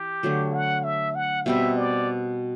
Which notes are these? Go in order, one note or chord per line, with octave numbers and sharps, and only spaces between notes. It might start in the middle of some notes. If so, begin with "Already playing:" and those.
Already playing: E3 G4
D3 F#3 A3
F#5
E5
F#5
B2 G3 C4 E5
D5